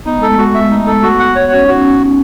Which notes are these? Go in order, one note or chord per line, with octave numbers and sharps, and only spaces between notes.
B3 D#4
G#3 A4
A3
G#3 F#4
A3 E5
D#4
A4
B3 F#4
F#5
C#5
C#4 F#4
D#4 F#4
C#4